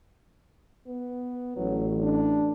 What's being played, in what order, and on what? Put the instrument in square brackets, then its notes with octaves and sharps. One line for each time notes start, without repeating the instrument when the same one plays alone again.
[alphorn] B3
[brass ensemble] A1 [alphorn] F#3
[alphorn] D4